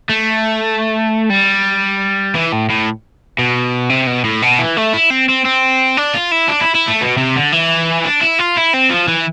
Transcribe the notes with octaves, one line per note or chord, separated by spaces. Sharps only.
A3
G3
E3
A2
A2
B2
C3
B2
A2
B2
E3
A3
E4
C4
C4
C4
D4
F4
E4
D4
E4
E4
A3
B2
C3
D3
E3
D4
E4
F4
E4
C4
F3
E3